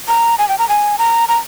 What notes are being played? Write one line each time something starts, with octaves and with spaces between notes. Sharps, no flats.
A#5
G#5
G5
A#5
G#5
A#5
A#5